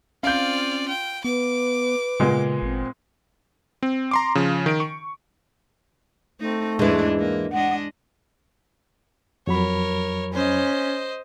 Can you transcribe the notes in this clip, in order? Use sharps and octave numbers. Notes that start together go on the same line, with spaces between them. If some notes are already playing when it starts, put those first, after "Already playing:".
C4 C#4 F4 D5 F5 G6
G5
B3 B4 D6
A#2 C#3 G#3 B3
G#1 C4
C4
A#5 C6 D6
C#3 F3
D#3 D7
C#6
A3 C4 D#4
E2 G#2 E3 G#3 D4
A#3
G#3 D4 D#5 F#5
F2 F#3 A#4 C#5 B5
C#4 C5 D#5